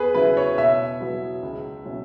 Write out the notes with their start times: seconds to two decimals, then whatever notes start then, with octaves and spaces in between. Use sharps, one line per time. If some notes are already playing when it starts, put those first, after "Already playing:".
Already playing: E2 G#4 B4
0.15 C#3 F#3 E4 B4
0.37 C#5
0.58 B2 E5
1.00 F#3 B3 E4
1.43 C#2
1.85 B2 F#3 C#4 E4